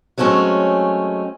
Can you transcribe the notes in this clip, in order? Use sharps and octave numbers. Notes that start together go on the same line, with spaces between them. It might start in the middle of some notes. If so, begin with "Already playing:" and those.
F#3 G#3 A3 C4 C#4